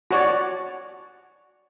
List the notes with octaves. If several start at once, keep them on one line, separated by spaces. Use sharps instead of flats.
F#4 C#5 D5